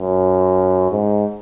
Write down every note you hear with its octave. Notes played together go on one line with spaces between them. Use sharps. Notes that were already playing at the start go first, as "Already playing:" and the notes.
Already playing: F#2
G#2